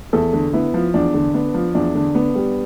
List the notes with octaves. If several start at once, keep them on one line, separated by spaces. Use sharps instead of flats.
E2 A4
D3
B3 E4
F3
E2 D4
D3
B3 D4
F3
E2 D4
D3
B3
G3